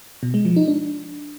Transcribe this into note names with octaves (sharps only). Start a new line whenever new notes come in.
B2
G#3
F3
D#4
D4